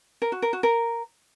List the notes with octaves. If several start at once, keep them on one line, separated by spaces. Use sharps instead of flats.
A#4
F#4
A#4
F#4
A#4